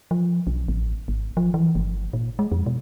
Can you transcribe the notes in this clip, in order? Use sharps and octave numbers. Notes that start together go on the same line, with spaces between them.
F3
B1
A1
G#1
F3
E3
G1
A#2
G#3
F2
B2